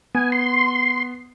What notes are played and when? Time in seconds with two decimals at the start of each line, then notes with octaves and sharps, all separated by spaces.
0.15 B3 G#5
0.32 C6